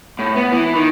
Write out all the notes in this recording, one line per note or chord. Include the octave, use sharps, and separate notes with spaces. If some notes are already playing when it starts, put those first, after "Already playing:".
A2
B3
E3
D#3